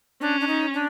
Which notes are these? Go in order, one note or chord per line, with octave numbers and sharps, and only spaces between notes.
C#4 D4
D4
D#4
D4